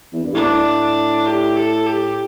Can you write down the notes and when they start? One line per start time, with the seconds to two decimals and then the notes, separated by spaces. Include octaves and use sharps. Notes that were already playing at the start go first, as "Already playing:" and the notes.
0.13 E2
0.23 G2
0.33 A2 D4
1.26 G4
1.56 A4
1.87 G4